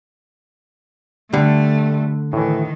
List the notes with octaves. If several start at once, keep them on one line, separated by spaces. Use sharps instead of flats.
D3 G3 A3
A2 D#3 E3